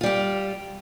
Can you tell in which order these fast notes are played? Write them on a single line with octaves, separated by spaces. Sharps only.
F4 G3 G4